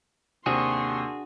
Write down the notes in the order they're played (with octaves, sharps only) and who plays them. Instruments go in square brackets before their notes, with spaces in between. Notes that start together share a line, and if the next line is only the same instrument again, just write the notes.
[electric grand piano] D#2 C3 D#7 [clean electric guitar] D4 F#4 G#4 [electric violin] C6 C#6